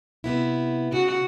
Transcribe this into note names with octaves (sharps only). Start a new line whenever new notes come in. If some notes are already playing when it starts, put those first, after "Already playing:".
C3 B3 E4
C#3 F#4